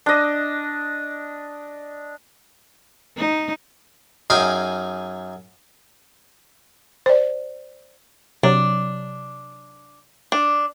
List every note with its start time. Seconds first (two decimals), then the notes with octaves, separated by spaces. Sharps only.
0.06 D4 D#5
3.17 D#4
4.30 F#2 D#4 G#4 F5 G5 G#5
7.06 C5 D5
8.43 C3 F#3 D4
10.32 D4